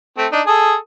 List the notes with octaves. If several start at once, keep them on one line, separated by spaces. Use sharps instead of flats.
A3 C4
D4 D#4
G#4 A4 D#6